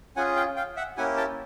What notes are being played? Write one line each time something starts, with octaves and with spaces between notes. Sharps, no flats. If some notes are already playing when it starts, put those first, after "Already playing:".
C#4 F4 G#4 F#5 G#5
F5 G5
F5 G5
E5 F#5
A#3 C#4 E4 G4 F#5 G#5
G5 A5